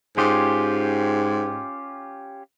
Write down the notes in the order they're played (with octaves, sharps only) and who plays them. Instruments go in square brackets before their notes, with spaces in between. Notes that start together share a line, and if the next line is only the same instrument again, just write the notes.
[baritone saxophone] G#2 [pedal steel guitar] C#4 F4 G4